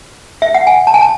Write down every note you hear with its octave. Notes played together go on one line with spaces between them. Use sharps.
E5
F#5
G#5
A5
G#5
A5